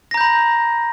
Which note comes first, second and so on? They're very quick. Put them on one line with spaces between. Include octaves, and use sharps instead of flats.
A#6 A#5 G6 B5